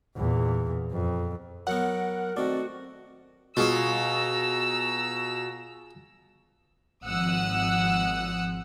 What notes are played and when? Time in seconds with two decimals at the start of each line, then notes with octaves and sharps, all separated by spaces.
0.17 E2 A#2
0.92 F2
1.67 F#3 B3 A#4 F#5
2.37 D#3 A3 C4 F#4 D5
3.57 B2 F4 G#4 C#5 A#5 E6
7.04 G#1 F3 F#5 D#6 E6 F#6